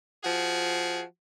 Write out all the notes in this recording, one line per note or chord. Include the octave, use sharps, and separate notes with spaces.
F3 F#4 G#4